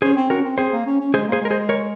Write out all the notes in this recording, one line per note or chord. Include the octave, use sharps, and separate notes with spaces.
C#4 G#4 C5
C4
C#4 F#4 A#4
C4
C4 G#4 C5
A#3
C#4
C#4
G#3 G#4 C5
A#3 G#4 C5
G#3 A#4
G#4 C5
A#4 C#5